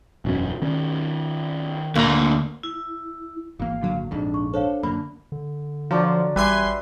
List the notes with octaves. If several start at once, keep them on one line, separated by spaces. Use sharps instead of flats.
E1 F#2 C#4
D#3 C#4
D2 A#3 A#5
E4
G#1 E3 A#3 F5
A#2 D3 F#3
A#1 F2 G#2 D4
C#6
D4 A4 C5 C#5 F5
F#2 D3 A#3 B5
D3
F3 F#3 D4
A1 G3 B4 E5 G#5 C6